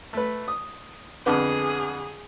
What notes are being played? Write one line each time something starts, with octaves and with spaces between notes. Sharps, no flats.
A3 B4
D#6
F2 D3 B3 G#4